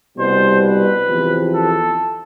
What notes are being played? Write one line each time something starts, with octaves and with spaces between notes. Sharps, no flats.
C2 B2 G3 C5
B4
E2 C3 F3
A4